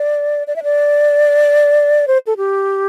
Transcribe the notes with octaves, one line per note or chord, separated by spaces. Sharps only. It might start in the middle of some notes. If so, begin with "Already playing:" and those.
Already playing: D5
D5
E5
D5
C5
A4
G4